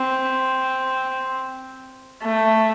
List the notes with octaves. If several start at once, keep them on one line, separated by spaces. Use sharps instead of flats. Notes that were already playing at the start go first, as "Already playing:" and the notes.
Already playing: C4
A3